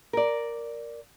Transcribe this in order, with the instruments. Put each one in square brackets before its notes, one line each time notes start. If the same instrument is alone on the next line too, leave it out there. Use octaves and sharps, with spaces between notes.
[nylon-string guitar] A#4 D5